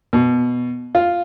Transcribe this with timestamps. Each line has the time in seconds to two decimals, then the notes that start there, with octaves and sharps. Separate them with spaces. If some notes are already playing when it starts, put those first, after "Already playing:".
0.13 B2
0.95 F4